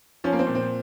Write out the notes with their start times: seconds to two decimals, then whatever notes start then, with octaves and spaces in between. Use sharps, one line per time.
0.24 F3 C#4
0.33 A#3
0.39 C4
0.47 A#2
0.55 C4